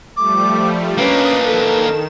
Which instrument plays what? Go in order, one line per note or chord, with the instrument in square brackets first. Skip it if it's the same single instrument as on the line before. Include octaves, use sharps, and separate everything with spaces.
[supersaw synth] F3 G3 A3 [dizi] D6
[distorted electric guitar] A#3 D4 [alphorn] C#4 [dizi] B4 [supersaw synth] D#5 D#6
[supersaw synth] D#3 E7 [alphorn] A4